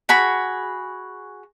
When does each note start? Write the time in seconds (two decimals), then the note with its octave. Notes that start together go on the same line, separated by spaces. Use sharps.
0.09 F#4 G#4 B5